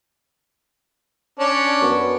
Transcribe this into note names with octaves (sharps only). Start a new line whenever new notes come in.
C#4 D4
F#2 B3 C#5